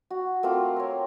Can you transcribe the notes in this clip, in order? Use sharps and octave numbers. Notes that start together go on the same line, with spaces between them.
F#4
A3 A#3 C4 F4
A#4 C#5